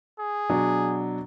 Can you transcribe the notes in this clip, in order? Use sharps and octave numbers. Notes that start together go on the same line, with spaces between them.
G#4
B2 F#3 D4